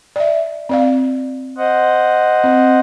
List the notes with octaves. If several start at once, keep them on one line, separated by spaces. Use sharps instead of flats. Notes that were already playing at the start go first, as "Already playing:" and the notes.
D5 E5
C4 D5 F5
C5 D#5 F#5
C4